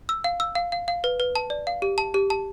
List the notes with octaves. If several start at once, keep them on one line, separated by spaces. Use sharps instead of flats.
E6
F5
E6
F5
F5
F5
B4
B4
A5
D5
F5
G4
A5
G4
A5